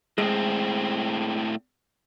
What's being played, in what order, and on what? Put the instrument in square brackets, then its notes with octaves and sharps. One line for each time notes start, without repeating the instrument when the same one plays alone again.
[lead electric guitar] A2 C4 [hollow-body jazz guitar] G#3